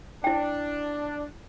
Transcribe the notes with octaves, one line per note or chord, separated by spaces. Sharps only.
D4 E4 G5